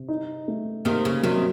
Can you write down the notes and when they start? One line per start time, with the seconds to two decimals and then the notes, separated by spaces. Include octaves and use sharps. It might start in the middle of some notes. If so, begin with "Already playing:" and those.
Already playing: C3
0.08 D#4
0.48 A3
0.85 C3 D#3 A#3
1.05 C#3
1.23 C3 D#3 F#3